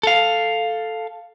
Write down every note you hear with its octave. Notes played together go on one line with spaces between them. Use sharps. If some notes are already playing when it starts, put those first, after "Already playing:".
A4 F5